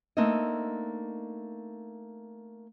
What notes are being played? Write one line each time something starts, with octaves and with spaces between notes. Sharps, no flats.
A3 A#3 C4 D4 D#4 D#5